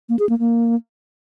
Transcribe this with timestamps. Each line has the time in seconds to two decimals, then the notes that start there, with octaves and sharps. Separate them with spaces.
0.09 A#3
0.19 G#4
0.29 A#3
0.39 A#3